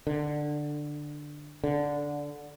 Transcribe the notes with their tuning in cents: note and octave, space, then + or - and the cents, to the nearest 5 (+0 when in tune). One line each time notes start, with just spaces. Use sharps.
D3 +10
D3 -10